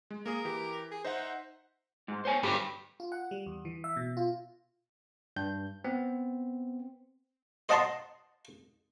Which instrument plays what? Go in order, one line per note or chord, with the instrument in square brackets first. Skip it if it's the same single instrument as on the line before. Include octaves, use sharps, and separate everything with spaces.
[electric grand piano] G#3
[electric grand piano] A#3 G#4 D#6 [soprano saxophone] A#4
[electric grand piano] E3 G4
[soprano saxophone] G#4
[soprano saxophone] D#4 [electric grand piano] C5 E5 F#5
[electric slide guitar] G#2
C5 C#5 G#5
[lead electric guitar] G2 [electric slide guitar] D3 G4
[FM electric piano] F4
F#5
G3
E2
E3
E5
B2
F4
[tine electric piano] G2 G6
B3 C4
[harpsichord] C5 D#5 F#5 A5 A#5 C6